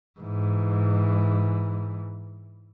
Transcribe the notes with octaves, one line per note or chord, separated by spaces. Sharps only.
G#2 E3